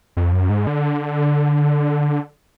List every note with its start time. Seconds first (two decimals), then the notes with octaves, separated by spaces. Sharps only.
0.17 F2
0.33 F#2
0.50 G#2
0.67 D3